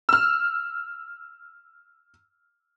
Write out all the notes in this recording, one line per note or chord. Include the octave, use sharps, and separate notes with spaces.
E6 F6